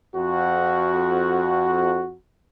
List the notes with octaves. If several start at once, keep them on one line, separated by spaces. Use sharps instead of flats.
F2 F#4